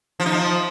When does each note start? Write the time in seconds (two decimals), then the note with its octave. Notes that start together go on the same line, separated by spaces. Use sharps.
0.20 F3
0.26 D#4
0.32 F3